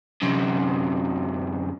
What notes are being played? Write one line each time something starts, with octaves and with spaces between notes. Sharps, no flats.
F#2 C3